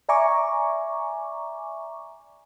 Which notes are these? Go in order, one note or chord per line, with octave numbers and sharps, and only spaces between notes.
D5 E5 G#5 A#5 C#6 D6